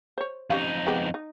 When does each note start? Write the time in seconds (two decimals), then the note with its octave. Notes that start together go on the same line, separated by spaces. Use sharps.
0.18 C5 C#5
0.50 F2 C#4 D#4 G4 F5
0.87 G#3 B3 G4
1.14 D#4